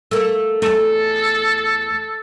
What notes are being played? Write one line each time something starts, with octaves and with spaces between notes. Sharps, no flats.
A3 A#3
E2 A3 A4